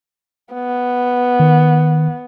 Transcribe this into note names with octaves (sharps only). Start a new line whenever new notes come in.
B3
D#3